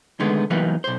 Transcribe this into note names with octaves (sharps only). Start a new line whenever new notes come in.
D3 D#3 G#3 A3 B3
E3 F#3 G3 A#3 B3 D#4
B1 C5